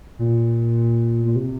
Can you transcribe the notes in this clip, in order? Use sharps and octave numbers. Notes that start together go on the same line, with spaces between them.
A#2
A#2
C3